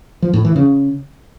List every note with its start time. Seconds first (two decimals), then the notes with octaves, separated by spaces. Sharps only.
0.22 F3
0.34 A2
0.45 E3
0.56 C#3